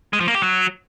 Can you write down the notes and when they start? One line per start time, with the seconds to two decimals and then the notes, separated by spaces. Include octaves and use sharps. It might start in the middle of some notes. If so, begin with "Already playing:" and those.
0.13 G#3
0.20 F3
0.28 A#3
0.35 G4
0.42 F#3